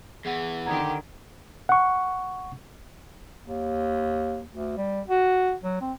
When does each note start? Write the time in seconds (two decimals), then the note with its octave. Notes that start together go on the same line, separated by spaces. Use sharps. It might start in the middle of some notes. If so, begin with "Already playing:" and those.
0.25 E2 E3 G#4 F#5
0.65 D3 D#3 G4 F#5 A#5 G#6
1.69 F#5 C#6
3.45 D#2
4.54 D2
4.77 G3
5.08 F#4
5.63 F#3
5.81 C4